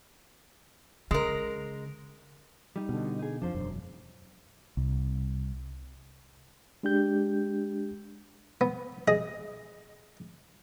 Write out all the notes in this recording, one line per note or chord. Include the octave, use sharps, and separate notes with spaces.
C#3 G#3 A#4
G3 D#4
B2 D3
D#4 G#4
F2 F3 D4 C5
E1 F#2
C2
G#3 D4 G4 G6
B3
G#4 D#5